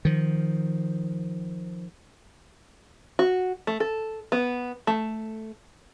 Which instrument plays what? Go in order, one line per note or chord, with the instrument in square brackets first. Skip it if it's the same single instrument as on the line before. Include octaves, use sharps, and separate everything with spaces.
[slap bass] D#3 F3
[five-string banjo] F#4
A3
A4
B3
A3